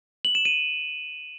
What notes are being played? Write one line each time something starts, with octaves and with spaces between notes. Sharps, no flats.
F#7
E7
D#7